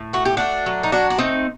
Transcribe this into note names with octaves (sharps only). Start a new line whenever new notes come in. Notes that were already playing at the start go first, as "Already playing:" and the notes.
Already playing: A2
A3 F#4
G4
A3 D4 F#4
F#3
D#4
F#3 D4 F#4
D4
A3 C4 D#4